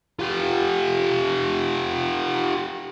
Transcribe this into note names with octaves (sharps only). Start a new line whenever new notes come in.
F4 G4